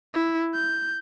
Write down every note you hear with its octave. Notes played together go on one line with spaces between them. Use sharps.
E4
G6